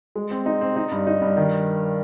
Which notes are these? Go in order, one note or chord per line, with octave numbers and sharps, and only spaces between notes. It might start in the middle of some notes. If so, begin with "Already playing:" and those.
G#3
C4
D#4
C4
D#4
G2
D#4
G2
D#3